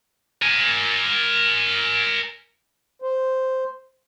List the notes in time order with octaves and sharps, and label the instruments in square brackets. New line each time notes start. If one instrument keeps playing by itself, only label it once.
[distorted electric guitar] A#4 G#5
[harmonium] C5